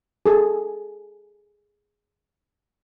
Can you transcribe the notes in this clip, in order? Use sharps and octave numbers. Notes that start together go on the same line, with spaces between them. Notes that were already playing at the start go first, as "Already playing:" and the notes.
G#4 A4